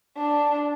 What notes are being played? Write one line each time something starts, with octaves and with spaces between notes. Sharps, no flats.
D4